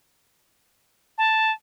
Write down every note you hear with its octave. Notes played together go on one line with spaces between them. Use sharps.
A5